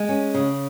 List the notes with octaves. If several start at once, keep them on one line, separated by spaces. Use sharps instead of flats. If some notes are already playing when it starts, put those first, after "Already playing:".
Already playing: G#3
C#4
C#3